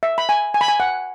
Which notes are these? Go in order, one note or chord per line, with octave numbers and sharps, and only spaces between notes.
E5
B5
G#5
G#5
B5
G#5
F#5